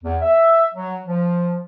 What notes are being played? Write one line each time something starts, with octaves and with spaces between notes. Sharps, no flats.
E2
E5
F#3
F3